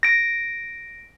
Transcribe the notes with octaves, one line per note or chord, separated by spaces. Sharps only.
A#6 D7